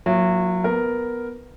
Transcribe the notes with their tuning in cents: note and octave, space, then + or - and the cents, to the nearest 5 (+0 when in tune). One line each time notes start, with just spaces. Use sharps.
F#3 -25 A#3 +0 E4 +35
B3 +0 A#4 +0